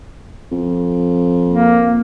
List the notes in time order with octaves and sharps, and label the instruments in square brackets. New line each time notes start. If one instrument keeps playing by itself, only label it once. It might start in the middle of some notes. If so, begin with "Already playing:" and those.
[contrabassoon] F2
[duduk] A#3